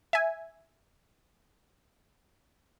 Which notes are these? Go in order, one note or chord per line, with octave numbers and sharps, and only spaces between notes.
E5 G#5